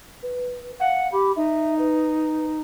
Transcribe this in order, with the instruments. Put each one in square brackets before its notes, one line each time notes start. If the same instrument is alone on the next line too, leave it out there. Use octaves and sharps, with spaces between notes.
[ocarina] B4
[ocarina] F5 [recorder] F#5
[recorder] G4 [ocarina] B5
[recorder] D#4 [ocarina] E5
[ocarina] B4